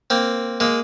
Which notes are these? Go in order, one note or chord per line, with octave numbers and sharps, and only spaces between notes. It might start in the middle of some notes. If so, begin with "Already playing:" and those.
A#3 C4
G#3 A#3